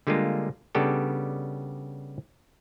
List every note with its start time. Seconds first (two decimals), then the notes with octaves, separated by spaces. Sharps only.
0.07 D3 G3 G#3 A#3 F4
0.75 C#3 G3 B3 D4 G4 A4